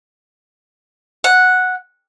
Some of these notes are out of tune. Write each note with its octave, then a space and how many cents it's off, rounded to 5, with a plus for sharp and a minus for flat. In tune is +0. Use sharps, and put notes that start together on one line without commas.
F#5 -5